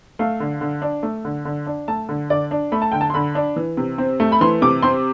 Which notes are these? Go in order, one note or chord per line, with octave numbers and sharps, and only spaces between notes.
A3 F5
D3
D3
D4
A3
D3
D3
D4
A3 A5
D3
D3 D5
D4
A3 B5
A5
D3 G5
A5
C6
D3 B5
D4
E3
C3
C4
A3
B5
E3 C6
C3 D6
C4 C6